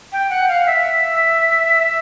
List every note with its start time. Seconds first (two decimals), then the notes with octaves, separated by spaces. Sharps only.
0.12 G5
0.30 F#5
0.49 F5
0.67 E5